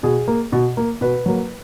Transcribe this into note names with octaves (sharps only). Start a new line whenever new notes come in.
B2 G#4
A#3
B2
A#3
B2 B4
F#3 A#3